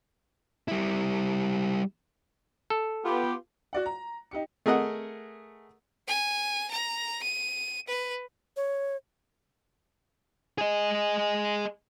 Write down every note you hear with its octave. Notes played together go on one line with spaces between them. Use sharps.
G3 E4
A4
B3 F4 G4
F#4 D5 F#5
A#5
D#4 G4 C#7
A3 G#4 A#4 D#5 F#5
G#5
A#5
D#7
B4
C#5
G#4 D#5